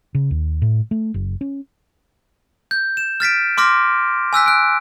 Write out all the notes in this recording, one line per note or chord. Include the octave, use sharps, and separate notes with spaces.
C#3
D#2
A2
A3
F#1
C#4
G6
E7
F6 A6 B6 D7
C6 D6 F6 A#6
G#5 E6 F#6 B6
F#6 D7